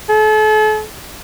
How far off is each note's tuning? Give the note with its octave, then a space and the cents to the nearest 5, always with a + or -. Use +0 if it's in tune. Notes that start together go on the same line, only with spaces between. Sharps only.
A4 -40